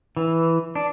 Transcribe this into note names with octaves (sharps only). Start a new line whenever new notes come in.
E3
D4